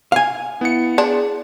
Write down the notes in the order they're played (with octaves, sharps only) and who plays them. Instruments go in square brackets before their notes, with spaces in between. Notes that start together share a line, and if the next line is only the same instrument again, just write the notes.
[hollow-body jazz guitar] F5 G#5
[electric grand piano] B3 C#7 [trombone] E4
[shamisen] D4 [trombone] G#4